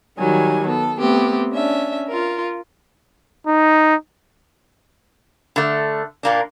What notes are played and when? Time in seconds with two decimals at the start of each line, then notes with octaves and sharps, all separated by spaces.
0.17 D#3 F#3 G3 G#5
0.67 B3 A4
0.98 A3 B3 C4 G4
1.52 C#4 D4 E5
2.08 F4 A#4
3.47 D#4
5.56 D3 A3
6.23 A#2 A#3 D4